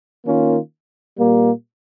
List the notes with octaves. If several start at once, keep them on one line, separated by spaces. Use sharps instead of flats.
D#3 A#3 C#4 F4
A#2 G3 A#3